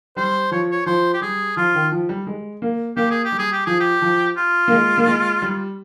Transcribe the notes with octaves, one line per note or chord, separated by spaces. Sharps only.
G3 C5
F3 C#5
C#5
F3 C5
G4
G3 G#4
F3 F4
D#3
F3
G3
G#3
A#3
A#3 G4
G#4
G4
G3
G#4
G4
F3 G#4
G4
F3
F4
A#3
G#3
A#3
G#3
G3